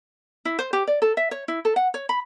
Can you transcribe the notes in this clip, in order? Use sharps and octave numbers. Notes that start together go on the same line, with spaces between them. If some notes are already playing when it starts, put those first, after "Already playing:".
E4
C5
G4
D5
A4
E5
C#5
E4
A4
F#5
C#5
B5